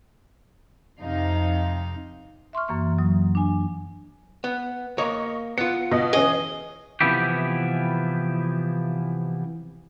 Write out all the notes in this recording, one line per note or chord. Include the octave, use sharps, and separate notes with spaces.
F2 C3 D#4 F5
E5 C6 C#6 F6
F#2 E3 A#3 C#6
F#3 D#6
D4 G#5
B3
A#3 C#5 D#5 C#6
B3 F4 C#7
B2 D#5
E3 C#4 G#4 D#5
C3 E3 F3 B3 E4 G4